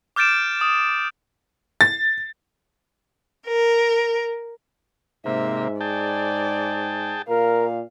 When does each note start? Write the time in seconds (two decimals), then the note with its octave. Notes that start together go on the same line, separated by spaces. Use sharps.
0.16 D6 F6 G6 A6 D7 E7
0.61 D#6
1.81 A6
3.46 A#4
5.26 G#2 C3 A#3 E5
5.81 G#4 D5 G5 A5
7.29 A#2 A#4 F5